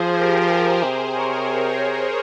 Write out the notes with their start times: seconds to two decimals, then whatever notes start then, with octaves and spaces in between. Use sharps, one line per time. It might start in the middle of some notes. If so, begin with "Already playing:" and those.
Already playing: F3 G#4 C5
0.18 G4 A#4
0.83 C3 G#4 C5
1.15 A#4 C#5